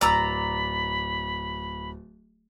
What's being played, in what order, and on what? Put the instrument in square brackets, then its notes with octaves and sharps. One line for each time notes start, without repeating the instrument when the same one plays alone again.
[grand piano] D1 [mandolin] D5 A#5 E6 [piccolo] B5